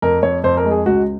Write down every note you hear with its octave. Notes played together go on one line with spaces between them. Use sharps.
F2 A#4
F2 C#5
F2 C5
A#4
G#3
G#4
C#2 F#4